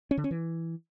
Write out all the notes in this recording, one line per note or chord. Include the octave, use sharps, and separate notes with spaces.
C#4
D3
C#4
E3